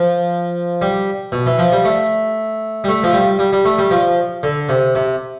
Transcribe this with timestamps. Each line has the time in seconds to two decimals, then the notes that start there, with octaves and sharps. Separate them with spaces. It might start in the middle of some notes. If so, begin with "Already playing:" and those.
Already playing: F3
0.82 G3
1.32 B2
1.46 E3
1.59 F3
1.72 G3
1.85 A3
2.84 G3
2.88 A3
3.03 F3
3.13 G3
3.39 G3
3.53 G3
3.65 A3
3.79 G3
3.91 F3
4.43 D3
4.69 C3
4.95 C3